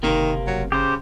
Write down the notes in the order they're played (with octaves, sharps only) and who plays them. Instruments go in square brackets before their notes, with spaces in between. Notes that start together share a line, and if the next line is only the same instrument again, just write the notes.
[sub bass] F#1 [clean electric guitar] C3 A#3 [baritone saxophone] D#3
[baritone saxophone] F#3
[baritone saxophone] C#3 [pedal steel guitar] G4 C5